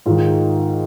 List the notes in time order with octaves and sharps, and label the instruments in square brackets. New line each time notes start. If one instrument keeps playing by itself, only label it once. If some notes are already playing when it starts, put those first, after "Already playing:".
[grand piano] G#2 D#3 F4